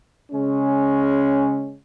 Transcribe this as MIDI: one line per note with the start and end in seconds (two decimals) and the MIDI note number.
0.32 1.75 49
0.32 1.75 56
0.32 1.75 61